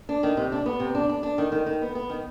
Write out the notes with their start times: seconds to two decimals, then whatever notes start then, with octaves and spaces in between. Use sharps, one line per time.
0.09 D4
0.23 D#3
0.37 C3
0.52 D4
0.66 B3
0.80 C3
0.95 D4
1.09 D4
1.23 D4
1.38 D#3
1.52 D#3
1.66 D#3
1.82 B3
1.95 B3
2.10 D#3